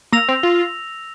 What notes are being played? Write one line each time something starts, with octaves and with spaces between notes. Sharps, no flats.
A#3 E6 A#6 F7
C4
F4